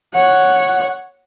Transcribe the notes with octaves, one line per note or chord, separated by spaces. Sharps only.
C#5 F#5